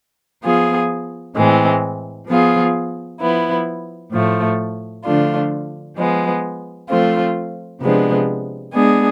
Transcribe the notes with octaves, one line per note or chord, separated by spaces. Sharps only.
F3 B3 F4 G#4
A2 E3 G#3 C4
F3 B3 F4 G#4
F3 B3 E4
A2 F3 A3
D3 F3 A3 D4 F4
F3 G#3 B3
F3 A3 C4 F4
C3 F3 G#3 B3 D4
G#3 B3 D4 G#4